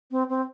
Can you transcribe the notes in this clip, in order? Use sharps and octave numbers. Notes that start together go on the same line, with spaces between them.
C4
C4